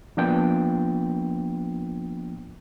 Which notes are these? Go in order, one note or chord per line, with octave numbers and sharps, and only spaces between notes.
F3 A#3 B3 D4 F4 G5